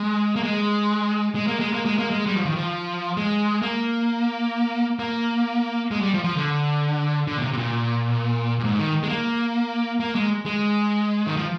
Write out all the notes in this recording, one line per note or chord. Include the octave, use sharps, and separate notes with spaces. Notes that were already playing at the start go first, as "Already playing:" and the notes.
Already playing: G#3
A#3
G#3
G#3
A#3
G#3
A#3
G#3
A#3
G#3
G3
F3
D#3
F3
G#3
A#3
A#3
G#3
G3
F3
F3
D3
D3
A#2
C3
C3
A#2
A#2
G#2
D#3
G#3
A#3
A#3
G#3
G#3
D#3
F3